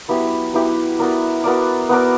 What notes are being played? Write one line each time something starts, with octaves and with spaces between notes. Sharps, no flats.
F#3 B3 E4 G4
F#3 B3 E4 G4
B3 F#4 A#4 D5
B3 F#4 A#4 D5
B3 F#4 A#4 D5